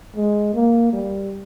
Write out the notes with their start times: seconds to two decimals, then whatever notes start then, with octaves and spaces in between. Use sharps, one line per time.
0.16 G#3
0.54 A#3
0.93 G3